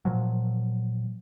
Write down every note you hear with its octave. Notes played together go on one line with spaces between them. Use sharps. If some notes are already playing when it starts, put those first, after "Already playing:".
A#2 F3 F#3